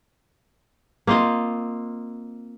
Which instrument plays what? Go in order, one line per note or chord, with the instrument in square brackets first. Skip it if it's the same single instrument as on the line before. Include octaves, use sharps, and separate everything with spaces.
[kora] A#3 C4 F4 D#5